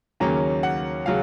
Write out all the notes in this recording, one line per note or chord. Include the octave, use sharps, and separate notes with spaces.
D#2 C#3 F#3 A#3 C#4 A#5
F#5
C#3 F#3 F5